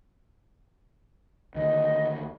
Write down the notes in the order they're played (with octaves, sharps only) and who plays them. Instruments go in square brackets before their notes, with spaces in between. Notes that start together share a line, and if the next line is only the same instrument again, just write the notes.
[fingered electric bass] D2 D#3 [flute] D#5